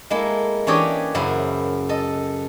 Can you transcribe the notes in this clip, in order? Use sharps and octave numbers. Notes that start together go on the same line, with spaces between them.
G#3 A#3 E4 A4
E3 C#4 D4 G4 C#5 D#5
F#2 C#3 E4 C5
A4 D#5